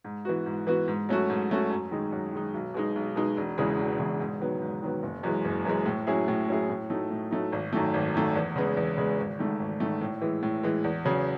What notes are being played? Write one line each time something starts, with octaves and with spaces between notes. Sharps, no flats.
G#2
E3 B3 F#4
G#2
E3 B3 F#4
G#2
F#3 A3 C#4 F#4
G#2
F#3 A3 C#4 F#4
F#2
D#3 G#3 D#4
F#2
D#3 G#3 D#4
B1
B2 G#3 D#4
B1
B2 G#3 D#4
E1
E2 C#3 E3 G#3
E1
E2 C#3 E3 G#3
G#2
D#3 F#3 B3
G#2
D#3 F#3 B3
F#1
F#2 E3 G#3
F#1
F#2 E3 G#3
A2
F#3 C#4 E4 G#4
A2
F#3 C#4 E4 G#4
A2
F#3 A3 D#4
A2
F#3 A3 D#4
G#1
F#2 D#3 A3
G#1
F#2 D#3 A3
E2
C#3 G#3 B3
E2
C#3 G#3 B3
G#1
G#2 D#3 A3
G#1
G#2 D#3 A3
A2
E3 G#3
A2
E3 G#3
E2
C#3 F#3